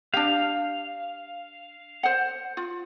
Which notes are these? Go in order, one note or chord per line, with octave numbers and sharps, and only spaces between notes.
D4 G4 F5
C5 F#5
F4